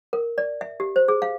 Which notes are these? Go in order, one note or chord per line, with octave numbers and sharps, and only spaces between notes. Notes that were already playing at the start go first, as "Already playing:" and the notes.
A#4
D5
E5
G4
C5
G#4
F5